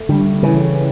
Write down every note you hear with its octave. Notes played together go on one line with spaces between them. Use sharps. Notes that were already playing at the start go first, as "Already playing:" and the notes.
Already playing: A3
D3 G3
C#3 E3